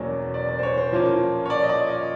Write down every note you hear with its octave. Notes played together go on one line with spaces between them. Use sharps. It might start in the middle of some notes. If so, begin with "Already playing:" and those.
Already playing: E2 B2 F#3 A#3 C#4 D5
D5
D5
C5
C#5
C5
A#2 F3 A#3 C#4
C#5
D5
D#5
D5
D#5